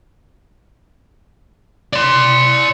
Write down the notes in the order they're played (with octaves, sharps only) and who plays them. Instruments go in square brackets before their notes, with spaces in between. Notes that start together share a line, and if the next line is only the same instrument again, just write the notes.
[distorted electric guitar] D5 C6